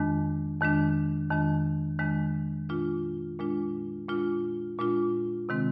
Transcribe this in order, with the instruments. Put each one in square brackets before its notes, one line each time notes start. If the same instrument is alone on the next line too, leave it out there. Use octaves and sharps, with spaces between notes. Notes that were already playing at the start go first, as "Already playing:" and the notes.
Already playing: [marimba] F2 D#3 G#3 D4
F2 D#3 G#3 D4
F2 D#3 G#3 D4
F2 D#3 G#3 D4
A#2 G#3 D4 F4
A#2 G#3 D4 F4
A#2 G#3 D4 F4
A#2 G#3 D4 F4
C3 D#3 G#3 C4